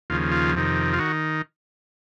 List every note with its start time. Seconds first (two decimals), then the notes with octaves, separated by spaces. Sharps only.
0.10 D#2 C#3 F3 F4
0.31 F4
0.55 F2 C3 D#3
0.93 F4
0.99 D#3 F#4